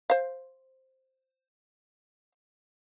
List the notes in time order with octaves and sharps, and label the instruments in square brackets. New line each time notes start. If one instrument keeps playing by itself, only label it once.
[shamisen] C5 F5